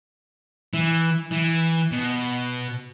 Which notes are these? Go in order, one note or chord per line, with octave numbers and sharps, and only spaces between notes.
E3
E3
B2